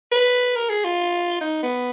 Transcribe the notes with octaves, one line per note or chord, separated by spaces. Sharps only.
B4
A#4
G#4
F4
D#4
B3